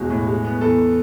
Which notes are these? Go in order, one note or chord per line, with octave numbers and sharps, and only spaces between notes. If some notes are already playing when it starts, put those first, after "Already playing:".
Already playing: E1 G#3 F#4
A2
G#3
B3
E2 A4